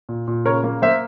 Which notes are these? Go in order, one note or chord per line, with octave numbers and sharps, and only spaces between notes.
A#2
A#2
C#3 A#4 C#5
A#3
A#3 C5 E5